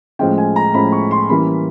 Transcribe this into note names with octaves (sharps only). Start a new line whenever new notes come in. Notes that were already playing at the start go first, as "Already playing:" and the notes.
A2 F3 G#3 C#4 G5
G#5
A#5
A2 F3 G#3 C#4 B5
C#6
C6
E3 G3 A#3 C#4 B5